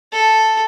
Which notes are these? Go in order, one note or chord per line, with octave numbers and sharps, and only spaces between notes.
A4